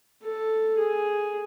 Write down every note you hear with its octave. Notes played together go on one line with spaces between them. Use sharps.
A4
G#4